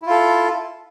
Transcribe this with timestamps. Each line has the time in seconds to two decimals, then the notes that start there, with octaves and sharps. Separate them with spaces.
0.02 E4
0.06 F4
0.10 A4